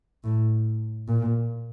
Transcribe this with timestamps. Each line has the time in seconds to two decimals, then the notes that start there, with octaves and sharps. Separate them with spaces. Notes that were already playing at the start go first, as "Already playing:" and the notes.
0.24 A2
1.08 A#2